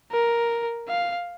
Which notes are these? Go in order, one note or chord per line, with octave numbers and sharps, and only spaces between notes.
A#4
F5